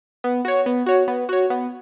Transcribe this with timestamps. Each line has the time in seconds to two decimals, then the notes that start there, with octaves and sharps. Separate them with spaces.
0.24 B3
0.45 F#4 C#5
0.66 B3
0.86 F#4 C#5
1.08 B3
1.29 F#4 C#5
1.50 B3